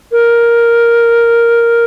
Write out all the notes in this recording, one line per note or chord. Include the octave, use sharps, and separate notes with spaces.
A#4